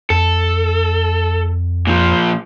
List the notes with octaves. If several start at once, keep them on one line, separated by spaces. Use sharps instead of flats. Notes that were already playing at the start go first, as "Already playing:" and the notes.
F2 A4
A#2 F3